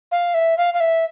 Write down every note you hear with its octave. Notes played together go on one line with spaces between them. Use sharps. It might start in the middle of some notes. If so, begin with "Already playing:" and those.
F5
E5
F5
F5
E5